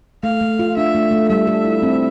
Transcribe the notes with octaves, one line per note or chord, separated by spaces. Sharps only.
A3 F5
A3
F4
D4 E5
A3
A3
G3 E5
A4
E4
C4